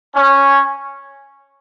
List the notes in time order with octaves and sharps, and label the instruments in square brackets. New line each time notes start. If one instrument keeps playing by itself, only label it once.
[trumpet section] C#4